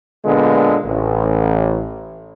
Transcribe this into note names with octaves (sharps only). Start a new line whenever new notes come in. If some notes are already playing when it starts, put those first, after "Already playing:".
A#2 D3 G#3 B3
A1